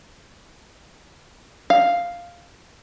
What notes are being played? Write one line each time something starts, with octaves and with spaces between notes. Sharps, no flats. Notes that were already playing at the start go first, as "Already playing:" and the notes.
F5